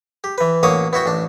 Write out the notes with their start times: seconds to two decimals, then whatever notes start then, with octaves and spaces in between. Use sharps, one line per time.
0.24 G4
0.38 E3 B4
0.63 A1 B2 A#3 C#5 D6 D#6
0.93 B3 E4 F#4 G5
1.06 A1 D4